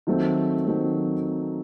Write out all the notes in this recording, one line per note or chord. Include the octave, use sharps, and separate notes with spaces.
D#3 F#3 A3 C4
D#3 F#3 A3 C4